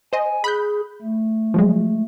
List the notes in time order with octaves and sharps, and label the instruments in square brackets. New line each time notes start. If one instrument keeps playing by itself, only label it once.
[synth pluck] C5 D#5 [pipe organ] G#5
[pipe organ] G#4 [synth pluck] B5 F#6 G6
[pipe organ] A3
[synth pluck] F3 F#3 G#3